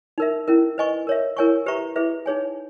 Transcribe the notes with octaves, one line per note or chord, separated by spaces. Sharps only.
D#4 A#4 E5
C#4 E4 A#4
B4 D#5 G#5 C#6
A#4 C#5 E5
E4 A#4 C#5 G#5 C#6
G4 B4 E5 A#5 C#6
E4 G#4 B4 E5
D#4 G#4 C#5 G#5